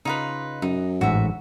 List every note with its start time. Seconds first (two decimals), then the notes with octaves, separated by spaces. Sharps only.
0.05 C#3 D#4 F4 B4
0.62 F#2 D#4
1.01 A1 G#2 F#4 E5